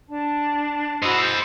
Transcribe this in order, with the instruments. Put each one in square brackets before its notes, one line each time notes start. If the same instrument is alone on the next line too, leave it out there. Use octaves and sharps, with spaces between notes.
[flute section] D4 A5
[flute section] F#4 B5 E6 [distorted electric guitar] C5 D#5
[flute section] G6